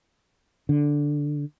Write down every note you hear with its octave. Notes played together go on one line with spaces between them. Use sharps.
D3